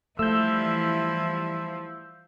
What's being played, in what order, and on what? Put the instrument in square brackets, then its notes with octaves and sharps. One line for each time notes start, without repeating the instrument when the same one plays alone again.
[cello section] E3 G3 E4 [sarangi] F3 [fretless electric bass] A3 [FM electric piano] E6 G6